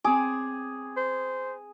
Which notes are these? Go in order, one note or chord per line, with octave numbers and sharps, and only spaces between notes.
C4 G#4 D6
C5